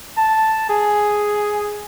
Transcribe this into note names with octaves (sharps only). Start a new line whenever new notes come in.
A5
G#4